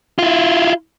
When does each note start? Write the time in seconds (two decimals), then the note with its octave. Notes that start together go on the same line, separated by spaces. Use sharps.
0.19 E4 F4